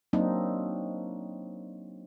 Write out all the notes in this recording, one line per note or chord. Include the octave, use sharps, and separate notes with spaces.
F#3 A#3 C4 D4 D#4